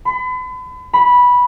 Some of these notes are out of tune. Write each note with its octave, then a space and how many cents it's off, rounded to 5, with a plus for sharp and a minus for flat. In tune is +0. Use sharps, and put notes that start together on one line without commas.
B5 +40
B5 -10